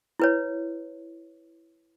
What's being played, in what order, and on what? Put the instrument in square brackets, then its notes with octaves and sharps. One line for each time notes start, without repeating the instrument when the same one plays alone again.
[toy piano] E4 B4 C#5